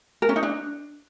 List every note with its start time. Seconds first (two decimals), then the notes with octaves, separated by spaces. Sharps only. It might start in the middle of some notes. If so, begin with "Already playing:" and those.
0.22 A#4
0.29 C#4
0.36 D#4
0.43 D4